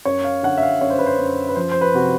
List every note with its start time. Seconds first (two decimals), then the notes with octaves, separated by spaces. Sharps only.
0.05 F#2 C#5
0.24 F5
0.43 D3 F#5
0.57 E5
0.63 F5
0.81 F#2 C#5
0.90 C5
0.99 B4
1.06 C5
1.19 F#2
1.49 B4
1.56 F3 C5
1.72 C5
1.81 B4
1.94 C3 F#4